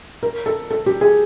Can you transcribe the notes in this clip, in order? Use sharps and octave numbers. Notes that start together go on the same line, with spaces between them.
A#4
A4
A4
G4
G#4